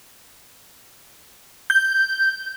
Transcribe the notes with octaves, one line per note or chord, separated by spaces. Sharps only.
G6